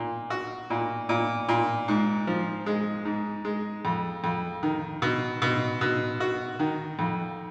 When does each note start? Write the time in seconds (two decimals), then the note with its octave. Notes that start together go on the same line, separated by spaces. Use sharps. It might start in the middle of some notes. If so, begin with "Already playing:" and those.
Already playing: A#2
0.30 F#4
0.70 A#2
1.09 A#2
1.48 A#2
1.88 G#2
2.27 F3
2.66 G#3
3.05 G#2
3.45 G#3
3.85 F2
4.24 F2
4.63 D#3
5.02 B2
5.42 B2
5.81 B2
6.20 F#4
6.59 D#3
6.99 F2